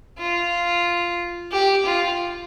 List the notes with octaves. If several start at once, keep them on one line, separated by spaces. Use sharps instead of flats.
F4
G4
F4